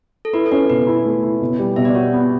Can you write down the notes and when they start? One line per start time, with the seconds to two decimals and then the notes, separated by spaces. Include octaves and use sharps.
0.25 A4
0.33 E4 B4
0.46 A4
0.52 C#4 B4
0.69 B2 B4
0.87 E4
1.05 A3
1.23 E4
1.41 B2
1.59 G3
1.76 B2 E5
1.85 D5
1.95 F#4 C#5
2.13 B3